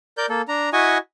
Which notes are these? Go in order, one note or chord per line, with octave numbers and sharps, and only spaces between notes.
A#4 D5 G6
A#3 A4
D4 A#5
E4 F#4 D#5 G#5 C#6 D#6